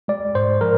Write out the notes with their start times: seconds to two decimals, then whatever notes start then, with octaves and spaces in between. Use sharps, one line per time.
0.08 G#3 D5
0.35 G#2 C5
0.61 F3 A#4